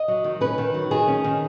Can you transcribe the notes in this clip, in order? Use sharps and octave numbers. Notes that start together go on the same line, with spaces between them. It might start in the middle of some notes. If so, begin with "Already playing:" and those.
Already playing: D#5
F#3
D#3
C#4 B4
D#3
F#3
D#3 G#4
C#4
D#3